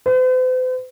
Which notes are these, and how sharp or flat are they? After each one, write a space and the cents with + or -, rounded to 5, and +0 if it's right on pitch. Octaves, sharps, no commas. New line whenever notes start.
C5 -45